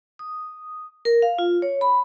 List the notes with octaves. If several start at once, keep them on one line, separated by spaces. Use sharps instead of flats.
D#6
A#4
F5
F4
C#5
B5